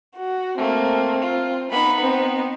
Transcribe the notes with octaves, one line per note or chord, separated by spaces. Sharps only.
F#4
A3 A#3 C4
F4
B3 D#4 B5
C4